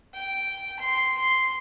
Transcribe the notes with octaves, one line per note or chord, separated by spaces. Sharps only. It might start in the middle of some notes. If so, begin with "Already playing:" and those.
G5
C6
C6